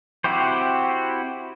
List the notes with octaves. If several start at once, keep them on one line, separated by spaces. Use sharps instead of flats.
C4 E4 F#4 G4 C5